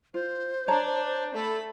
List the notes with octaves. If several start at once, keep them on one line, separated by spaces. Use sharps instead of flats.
F4 C5
D4 C#5 A5 A#5
A3 A4 B5